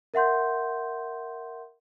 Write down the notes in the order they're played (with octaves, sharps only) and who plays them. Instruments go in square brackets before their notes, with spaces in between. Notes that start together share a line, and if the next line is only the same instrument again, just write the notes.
[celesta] A#4 E5 F#5 C6 G6